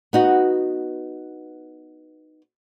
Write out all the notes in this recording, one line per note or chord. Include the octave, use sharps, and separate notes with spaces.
B3 D#4 F#4